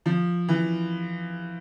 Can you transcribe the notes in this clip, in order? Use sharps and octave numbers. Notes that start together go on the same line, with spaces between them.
F3
E3